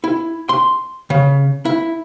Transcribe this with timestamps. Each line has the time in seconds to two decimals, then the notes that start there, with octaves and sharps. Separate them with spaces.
0.04 E4
0.49 C6
1.10 C#3
1.65 E4